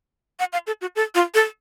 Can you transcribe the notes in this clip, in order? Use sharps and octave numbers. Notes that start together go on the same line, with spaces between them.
F#5
F5
A4
F#4
A4
F4
A4